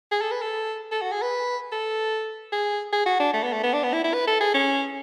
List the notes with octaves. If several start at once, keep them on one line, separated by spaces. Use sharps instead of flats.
G#4
A4
B4
A4
A4
F#4
G#4
B4
A4
G#4
G#4
F#4
D4
A3
B3
A3
B3
D4
B3
E4
E4
B4
A4
G#4
C#4